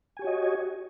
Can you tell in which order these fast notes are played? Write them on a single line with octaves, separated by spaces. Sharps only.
G#5 G4 C#5 F#4 D#5